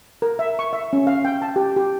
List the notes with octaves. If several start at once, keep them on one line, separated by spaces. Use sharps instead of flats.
A#4
E5
C#6
E5
C#4
F5
G5
A5
G4
G4